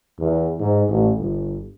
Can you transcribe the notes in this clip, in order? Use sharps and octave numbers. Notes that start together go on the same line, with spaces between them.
E2
G#2
A1
G1